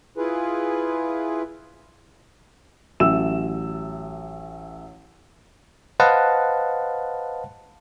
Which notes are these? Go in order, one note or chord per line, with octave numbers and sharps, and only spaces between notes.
E4 F4 G#4 B4
A1 F#3 E5 E6 E7
B4 C5 D#5 F5 F#5 A5